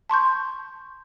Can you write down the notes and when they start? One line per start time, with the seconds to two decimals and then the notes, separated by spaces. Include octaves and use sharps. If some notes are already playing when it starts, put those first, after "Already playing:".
0.10 A5 C6 C#6 G6